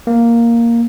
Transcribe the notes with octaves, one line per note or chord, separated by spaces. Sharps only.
A#3